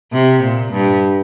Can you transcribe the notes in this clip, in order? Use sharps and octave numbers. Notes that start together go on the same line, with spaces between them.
C3
A#2
G2